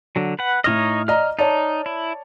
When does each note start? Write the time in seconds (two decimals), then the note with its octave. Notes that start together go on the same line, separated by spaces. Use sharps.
0.16 D3 F#3
0.39 B4 F#5
0.64 A2 D#4 C#5 D#5 F6
1.08 D5 D#5 A#5 F6
1.39 D#4 C#5 D5 A5
1.86 E4